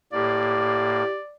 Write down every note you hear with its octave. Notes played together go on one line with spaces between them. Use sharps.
A2 A#3 G4 D5